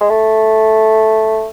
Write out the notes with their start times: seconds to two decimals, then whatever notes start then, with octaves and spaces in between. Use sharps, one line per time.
0.01 G#3
0.10 A3